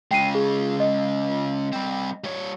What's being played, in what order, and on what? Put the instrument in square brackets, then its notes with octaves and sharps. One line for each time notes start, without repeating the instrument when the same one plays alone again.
[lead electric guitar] C#3 G#3 [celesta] G5 C7 D#7
[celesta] G#4
D#5
[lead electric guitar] G3 C4
G3 C#5